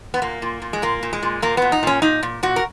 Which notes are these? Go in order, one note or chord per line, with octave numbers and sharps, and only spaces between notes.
B3
A#2 A#3
A#2
A#2
G#3
A#2 A#3
A#2
G#3
A#2
A#2 A#3
A#2 B3
D#4
A#2 C#4
A#2 D#4
A#2
A#2 F#4
A#4